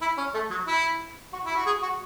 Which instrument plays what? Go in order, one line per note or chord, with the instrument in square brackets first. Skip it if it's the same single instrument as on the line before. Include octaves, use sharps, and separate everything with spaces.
[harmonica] E4
C#4
A3
F#3
E4
F#4
E4
F#4
G#4
F#4